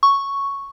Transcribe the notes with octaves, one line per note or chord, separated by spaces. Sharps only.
C#6